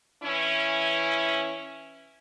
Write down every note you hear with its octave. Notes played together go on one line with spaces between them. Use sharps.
E3 C#4 E4